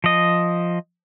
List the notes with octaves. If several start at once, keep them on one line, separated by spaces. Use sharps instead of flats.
F3 D#5